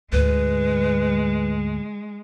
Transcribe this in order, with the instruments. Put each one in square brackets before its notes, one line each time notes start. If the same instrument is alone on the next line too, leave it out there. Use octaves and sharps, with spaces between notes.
[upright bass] D2 G#2 [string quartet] G#3 [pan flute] B4